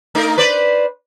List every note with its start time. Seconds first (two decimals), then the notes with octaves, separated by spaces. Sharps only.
0.15 A3 D#4 A#4
0.38 B4 C5 D5